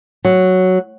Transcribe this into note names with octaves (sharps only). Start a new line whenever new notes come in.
F#3